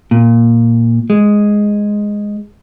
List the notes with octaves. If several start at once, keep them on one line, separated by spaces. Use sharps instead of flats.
A#2
G#3